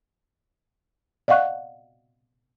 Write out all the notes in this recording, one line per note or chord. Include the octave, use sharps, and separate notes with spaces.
D5 D#5 F5 F#5 C#6 F#6